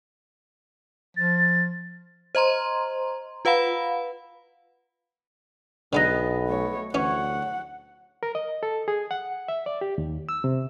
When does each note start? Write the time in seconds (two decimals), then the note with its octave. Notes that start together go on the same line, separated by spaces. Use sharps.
1.17 F3 A6
2.35 C5 D#5 A#5 C6
3.45 F4 B4 F5 F#5 B5
5.93 B1 D3 G#3 B3 D#4 D#5
6.47 A3 C#5
6.94 D2 E3 C#4 C#5 F#5
8.23 A#4
8.35 D#5
8.63 A4
8.88 G#4
9.11 F#5
9.48 E5
9.66 D5
9.81 G4
9.98 D#2
10.29 E6
10.44 C3